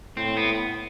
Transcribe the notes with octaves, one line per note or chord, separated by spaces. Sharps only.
A2 C4
B3